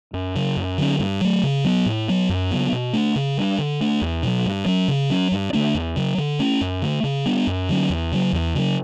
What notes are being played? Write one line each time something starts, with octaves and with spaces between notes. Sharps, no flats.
F#2
C#3 F#3
F#2
D3 F#3 C#4
G2
F#3 A3
C#3
F#3 B3
A2
F#3 B3
F#2
C#3 F#3 B3
B2
A3 D4
C#3
G3 D4
D3
A3 D4
E2
B2 F#3
G2
F#3 C#4
C#3
F#3 C#4
G2
D3 A3 D4
E2
C#3 F#3
D3
A3 C#4
F#2
D3 A3
C#3
G3 B3 D4
F#2
D3 F#3 C#4
E2
C#3 F#3
E2
C#3 F#3